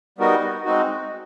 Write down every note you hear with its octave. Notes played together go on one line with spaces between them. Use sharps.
G3 B3 D#4 F#4 A#4
G#3 C4 D#4 F#4